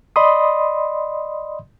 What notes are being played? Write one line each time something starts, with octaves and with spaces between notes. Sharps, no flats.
D5 D#5 B5 C6 D#6